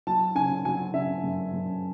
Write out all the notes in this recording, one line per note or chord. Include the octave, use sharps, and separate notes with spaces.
F#3 A5
C#3 G#5
F#3 G#5
C#3 E5
F#2
F#2